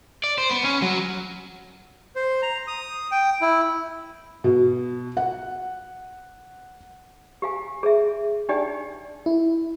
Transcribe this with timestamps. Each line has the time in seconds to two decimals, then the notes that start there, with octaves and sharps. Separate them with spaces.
0.24 D5
0.38 C5
0.51 B3
0.64 C#4
0.82 F#3
2.16 C5
2.42 A#5
2.67 D#6
3.11 G5
3.41 E4
4.44 B2
5.17 F#5
7.42 G4 F5 G#5
7.83 G#4 E5
8.49 D4 D#4 G4 D5 G5 G#5
9.26 E4